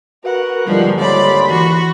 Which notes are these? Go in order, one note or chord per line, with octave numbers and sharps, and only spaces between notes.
F#4 A#4 B4 F#5
D#2 G#2 D3 F3 G3
C#5 D5 B5 C6
E3 F#4